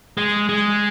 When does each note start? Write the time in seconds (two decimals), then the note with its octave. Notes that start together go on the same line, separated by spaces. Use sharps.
0.17 G#3
0.49 G#3